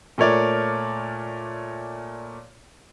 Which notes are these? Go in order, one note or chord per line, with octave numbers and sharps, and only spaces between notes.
A#2 A3 A#4 C#5 D5